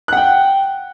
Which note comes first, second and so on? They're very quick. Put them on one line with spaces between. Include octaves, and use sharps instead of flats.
F#6 F#5 G5